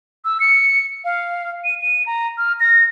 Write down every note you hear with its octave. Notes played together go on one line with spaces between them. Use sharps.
E6
C#7
F5
D#7
D#7
A#5
F6
A#6